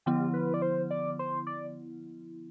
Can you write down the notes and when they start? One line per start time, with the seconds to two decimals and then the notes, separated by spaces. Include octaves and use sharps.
0.06 D3 F3 B3 E4 G4
0.34 B4
0.54 D5
0.62 C5
0.91 D5
1.19 C5
1.47 D5